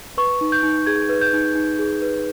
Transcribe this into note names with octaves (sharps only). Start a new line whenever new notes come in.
B4 C#6
D#4
G6
D#4
G#4 G#6
B4
G6
D#4
D#4
G#4
B4